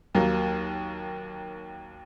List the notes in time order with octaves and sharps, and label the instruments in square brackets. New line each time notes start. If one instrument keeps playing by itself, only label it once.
[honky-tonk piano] D#2 F#3 A#3